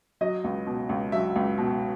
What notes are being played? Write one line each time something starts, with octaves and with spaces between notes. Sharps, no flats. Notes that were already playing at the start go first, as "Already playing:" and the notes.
F#3 D#5
C#2
B2
C#2
F#3 E5
C#2
B2